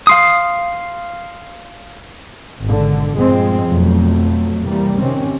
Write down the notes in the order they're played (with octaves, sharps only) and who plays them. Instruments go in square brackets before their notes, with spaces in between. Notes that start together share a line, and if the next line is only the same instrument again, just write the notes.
[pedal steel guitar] F5 C6 D#6
[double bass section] G#1 G#2 B2 D3
G2 A#2 F3 G#3 C4
F2 B2 F3 F#3 A3
C3 E3 G3 A#3
C3 D#3 C4 C#4